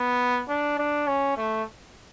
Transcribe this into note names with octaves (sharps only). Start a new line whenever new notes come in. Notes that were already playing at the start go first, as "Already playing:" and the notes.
Already playing: B3
D4
D4
C#4
A3